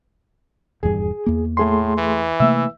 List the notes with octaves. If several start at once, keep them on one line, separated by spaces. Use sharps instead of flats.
D#1 E2 G2 G#4
E2 A#3
A2 A3 G#4 C6
E3
C3 A3 A#3 E5 E6